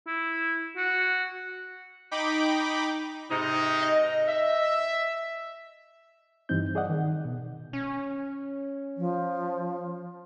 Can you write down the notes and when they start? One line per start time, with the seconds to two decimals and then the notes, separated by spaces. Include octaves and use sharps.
0.07 E4
0.77 F#4
2.11 D#4 G5 B5 D6
3.31 G#2 C3 D#4
3.82 D#5
4.27 E5
6.49 G2 E3 G3 C4 D#4 G6
6.75 G#4 D5 D#5 F#5
6.90 D#3
7.25 B2
7.73 C#4
8.97 F3